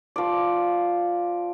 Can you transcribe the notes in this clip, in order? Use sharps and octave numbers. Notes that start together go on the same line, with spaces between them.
F3 D5